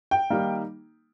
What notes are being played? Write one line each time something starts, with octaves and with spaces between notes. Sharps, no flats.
G5
D#3 G3 A#3 D#4